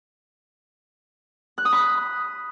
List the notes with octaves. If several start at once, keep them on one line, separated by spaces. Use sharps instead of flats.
F#6
D#6
B5